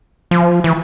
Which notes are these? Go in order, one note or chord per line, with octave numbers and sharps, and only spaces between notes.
F3
E3